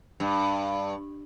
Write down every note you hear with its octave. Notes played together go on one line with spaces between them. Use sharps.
G2